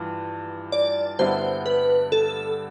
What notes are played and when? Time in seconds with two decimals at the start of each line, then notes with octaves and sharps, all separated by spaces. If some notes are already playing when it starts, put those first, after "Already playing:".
Already playing: G2 E3 F4
0.72 D5
1.19 G2 D3 G3 B3 E4 C5
1.66 B4
2.12 A4